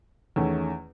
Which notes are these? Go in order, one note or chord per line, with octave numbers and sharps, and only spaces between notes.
E2 D#3 A3 C#4